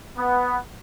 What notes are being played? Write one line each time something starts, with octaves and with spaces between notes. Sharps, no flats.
B3